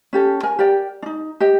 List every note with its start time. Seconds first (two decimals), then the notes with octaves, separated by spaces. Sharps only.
0.13 C#4 G4 A4
0.43 A#4 G#5
0.59 G4 A#4 D5 G5
1.02 D4 D#4
1.40 G4 D#5 G5